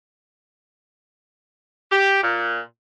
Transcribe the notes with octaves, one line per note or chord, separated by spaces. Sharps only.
G4
A#2